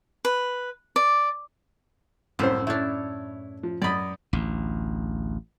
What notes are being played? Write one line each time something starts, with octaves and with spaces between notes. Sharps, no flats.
B4
D5
C2 F#2 A2 A3 C5
A3 D4 E4 C#5
F3
F#2 D5 D#5 B5
A1 D2